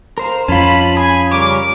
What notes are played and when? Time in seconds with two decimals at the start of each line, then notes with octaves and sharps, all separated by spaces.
0.18 A#4 C5 F5
0.48 F2 C#4 F4 A5 B5
0.97 G#4 G#5 B5
1.31 C#3 G3 A#4 C#5 D6